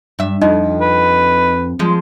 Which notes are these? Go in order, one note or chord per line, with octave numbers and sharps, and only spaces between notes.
G2 E5
F2 D#4 D#5
B4
F3 G#3